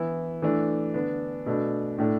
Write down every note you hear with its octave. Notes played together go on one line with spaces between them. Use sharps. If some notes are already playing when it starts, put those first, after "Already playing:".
Already playing: E3 B3 E4
E3 A3 D4
D3 B3 D4
B2 A3 D4
A2 A3 D4